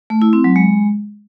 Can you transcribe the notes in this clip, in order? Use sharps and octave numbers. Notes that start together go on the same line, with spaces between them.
A3
E4
C4
F#3
G#3